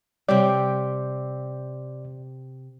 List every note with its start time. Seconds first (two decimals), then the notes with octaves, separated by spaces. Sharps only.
0.29 C3 G3 C4 G4 C#5 D5